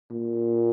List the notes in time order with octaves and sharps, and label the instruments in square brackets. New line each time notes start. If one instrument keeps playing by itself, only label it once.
[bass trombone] A#2